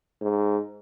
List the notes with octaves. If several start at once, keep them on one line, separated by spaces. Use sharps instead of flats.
G#2